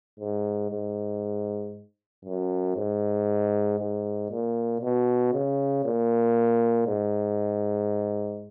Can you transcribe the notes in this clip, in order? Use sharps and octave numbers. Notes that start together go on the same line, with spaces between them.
G#2
G#2
F#2
G#2
G#2
A#2
B2
C#3
A#2
G#2